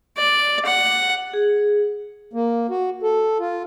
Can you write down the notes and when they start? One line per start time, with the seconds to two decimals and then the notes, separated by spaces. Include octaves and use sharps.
0.17 D5
0.65 F#5
1.34 G#4
2.33 A#3
2.70 F#4
3.03 A4
3.39 F4